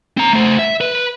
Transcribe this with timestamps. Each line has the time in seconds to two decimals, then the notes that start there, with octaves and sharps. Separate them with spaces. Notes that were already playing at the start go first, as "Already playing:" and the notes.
0.17 C4 A#5
0.33 A3 C5
0.59 E5
0.81 B4